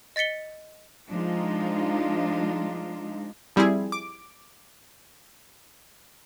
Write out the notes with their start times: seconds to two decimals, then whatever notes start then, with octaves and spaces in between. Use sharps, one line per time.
0.16 D#5 A6 B6 C#7 G7
1.10 F3 G#3 D4 D#4 F4
3.56 F3 G3 C4 E4 G#4
3.92 D6